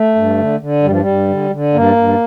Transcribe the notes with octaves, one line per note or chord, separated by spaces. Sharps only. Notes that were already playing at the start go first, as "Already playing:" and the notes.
Already playing: A3
G2
D3
D3
G2 G3
F3
G3
G2
D3
D3
G2 A#3
G2